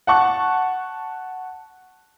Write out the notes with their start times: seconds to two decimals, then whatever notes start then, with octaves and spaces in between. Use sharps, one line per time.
0.07 F#5 A5 C#6 F#6